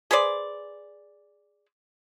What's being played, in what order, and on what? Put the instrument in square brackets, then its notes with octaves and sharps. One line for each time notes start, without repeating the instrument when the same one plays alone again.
[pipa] G#4 B4 C5 D5